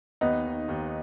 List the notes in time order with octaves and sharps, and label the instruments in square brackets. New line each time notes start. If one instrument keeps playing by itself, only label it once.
[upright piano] D#2 [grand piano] B3 D#4
[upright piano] D#3
D#2